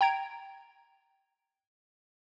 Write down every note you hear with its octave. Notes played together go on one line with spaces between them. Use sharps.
G5 A#5 G#6 D7